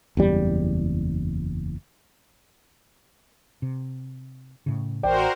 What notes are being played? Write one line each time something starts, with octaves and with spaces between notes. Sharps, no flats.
F#1 E2 G3
C3
A2 C#3
A1 F#4 A#4 C5 D5 G5